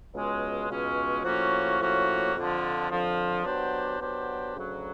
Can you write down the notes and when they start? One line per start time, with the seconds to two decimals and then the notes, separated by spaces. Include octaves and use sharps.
0.13 C#2 B2 G#3 C#4
0.69 C#2 B2 G#3 C#4
1.23 A2 F3 A#3 C#4 F#4
1.79 A2 F3 A#3 C#4 F#4
2.34 F2 D3 F3
2.89 F2 D3 F3
3.45 F#3 B3 D4 G4 C5
4.00 F#3 B3 D4 G4 C5
4.55 D2 C#3 F#3